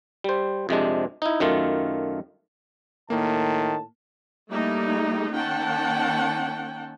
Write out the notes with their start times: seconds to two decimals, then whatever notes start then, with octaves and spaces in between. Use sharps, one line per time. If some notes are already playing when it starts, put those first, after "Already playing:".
0.24 G3 C5
0.69 F2 C3 G#3 D4
1.22 D#4 E4
1.40 F#2 D#3 A3 F4
3.10 A2 D#3 A#3 A5
4.49 G3 A3 A#3 D#4 E4
5.32 D#3 A#3 C#4 F#5 G5 A5